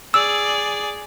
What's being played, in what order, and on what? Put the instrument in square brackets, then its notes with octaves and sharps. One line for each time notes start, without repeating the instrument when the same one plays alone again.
[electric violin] G#4 D5 [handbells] E6